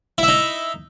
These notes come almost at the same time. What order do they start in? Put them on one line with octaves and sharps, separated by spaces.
E4 E5 D#4